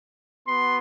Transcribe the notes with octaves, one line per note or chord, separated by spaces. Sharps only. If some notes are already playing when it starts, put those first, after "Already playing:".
B3 F#4 C6